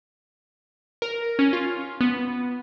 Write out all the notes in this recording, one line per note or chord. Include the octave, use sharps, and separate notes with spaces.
A#4
C#4
F4
B3